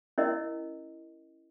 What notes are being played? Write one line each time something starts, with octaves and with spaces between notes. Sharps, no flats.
C#4 E4 A#4 D#5